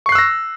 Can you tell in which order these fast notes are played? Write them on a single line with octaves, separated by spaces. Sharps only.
C#6 C7 F#6 E6 A#6